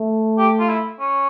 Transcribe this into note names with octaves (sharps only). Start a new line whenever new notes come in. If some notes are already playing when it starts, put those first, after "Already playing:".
Already playing: A3
G4
F4
E4
C#4